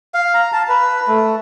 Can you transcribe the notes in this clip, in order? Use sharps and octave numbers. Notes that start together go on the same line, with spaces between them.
F5
A#5
A5
B4
A3